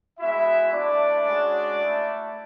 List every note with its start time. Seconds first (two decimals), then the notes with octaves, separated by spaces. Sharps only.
0.19 G#3 B3 E4 F#4 E5
0.72 A3 D4 E4 D5
1.25 G#3 C#4 F#4
1.77 A3 E4